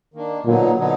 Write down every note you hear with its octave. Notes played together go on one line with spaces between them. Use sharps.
D#3 A#3 D4
A#2 D3 F#3 B3 D#4
D3 F#3 B3 D#4